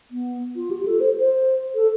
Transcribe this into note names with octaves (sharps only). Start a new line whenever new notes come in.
B3
F4
G4
A4
C5
C5
A4